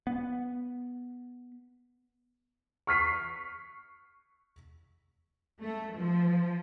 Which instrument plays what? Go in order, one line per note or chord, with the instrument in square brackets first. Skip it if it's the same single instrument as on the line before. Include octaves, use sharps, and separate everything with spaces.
[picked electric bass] B3
[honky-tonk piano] C#6 F6 B6 C7
[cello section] A3
F3